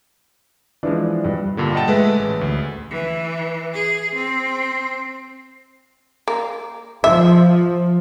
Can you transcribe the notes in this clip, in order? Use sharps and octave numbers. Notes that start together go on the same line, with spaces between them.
E3 F3 G#3 D4
G2
G2 A#2 D3
D#5 F#5 G5 A5
G#3 A3 B4 E5
A1
D2
E3
G#4
C4
A#3
F3 E5